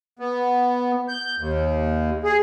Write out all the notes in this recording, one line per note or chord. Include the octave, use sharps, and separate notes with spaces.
B3
G6
D#2
G#4